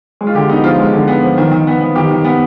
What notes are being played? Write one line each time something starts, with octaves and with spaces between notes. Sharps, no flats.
G#3
F4
D3 G4
B3 D#4
F3 F4
G#3
D3
B3
F3
D#3
D#3
B3
B3
D#3 G4
D#3
B3